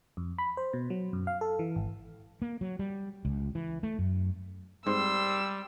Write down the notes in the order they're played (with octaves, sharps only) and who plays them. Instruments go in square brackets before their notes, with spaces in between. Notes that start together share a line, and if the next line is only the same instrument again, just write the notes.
[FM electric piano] F2
B5
C5
B2
F#3
F#2
F5
A4
E3
G#1
[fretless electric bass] A#3
F#3
G3
C#2
E3
A3
F#2
[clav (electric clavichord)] G#2 C4 [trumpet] G3 [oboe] C6 [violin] E6